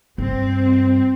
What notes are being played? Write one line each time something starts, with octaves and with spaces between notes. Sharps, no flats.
G2 C4